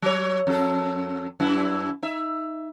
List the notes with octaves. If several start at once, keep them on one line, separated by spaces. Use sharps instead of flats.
F#3 C#5
F2 A4
F#2 E4
D#4 E5